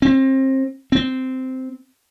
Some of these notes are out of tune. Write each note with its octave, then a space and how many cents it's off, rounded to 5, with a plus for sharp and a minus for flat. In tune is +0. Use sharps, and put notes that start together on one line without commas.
C4 +30
C4 -10